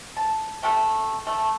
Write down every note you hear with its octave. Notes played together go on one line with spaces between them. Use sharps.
A5
C3 A3 G4 A4
A3